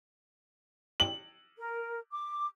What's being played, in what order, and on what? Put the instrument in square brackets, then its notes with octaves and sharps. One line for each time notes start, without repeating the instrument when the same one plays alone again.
[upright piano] F#7
[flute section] A#4
D6